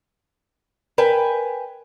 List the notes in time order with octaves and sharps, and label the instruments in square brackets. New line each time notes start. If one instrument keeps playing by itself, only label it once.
[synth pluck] A#4 [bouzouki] B4 G5 G#5